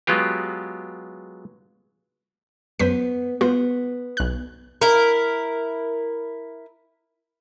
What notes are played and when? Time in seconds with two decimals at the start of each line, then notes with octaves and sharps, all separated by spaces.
0.07 F#3 G#3 B3 F4 G4
2.79 F#2 B3 C5 B6
3.41 B3 F4 F#4 C5
4.17 B1 F#6
4.81 E4 A#4